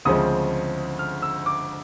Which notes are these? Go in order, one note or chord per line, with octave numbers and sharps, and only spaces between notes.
D2 C#3 F3 G#3 C4 D#6
F6
E6
D6